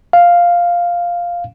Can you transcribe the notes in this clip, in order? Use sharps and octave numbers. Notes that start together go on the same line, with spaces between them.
F5